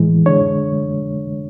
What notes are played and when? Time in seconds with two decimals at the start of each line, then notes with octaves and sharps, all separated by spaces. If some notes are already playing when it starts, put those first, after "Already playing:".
Already playing: A2 E3 G#3
0.26 D3 G#3 D4 C#5